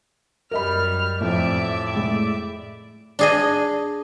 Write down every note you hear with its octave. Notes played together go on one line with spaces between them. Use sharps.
F#2 G3 A#4 D#5 B5 F6
A1 F2 D5 E5
A2 G#3
D4 G#4 D#5